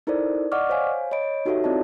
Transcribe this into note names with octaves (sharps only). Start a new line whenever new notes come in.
D#4 E4 A4 A#4 C5 D5
D5 D#5 F#5 C#6 D6 F6
C5 C#5 F5 G#5
C#5 D#5 B5 D7
D#4 F#4 G4 A4 C#5 E5
C4 E4 F4 D5 D#5 A5